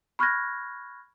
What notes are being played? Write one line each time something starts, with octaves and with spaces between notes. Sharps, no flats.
B5 C#6 F6 F#6 G#6 A#6